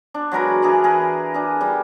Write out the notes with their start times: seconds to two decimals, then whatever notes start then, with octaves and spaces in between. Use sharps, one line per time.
0.14 D4
0.32 F#3 G#3 A#4 B4
0.62 E3 D4 G#4 A#4
0.84 G#4 A#4 B4
1.34 D4 G#4
1.61 G3 D4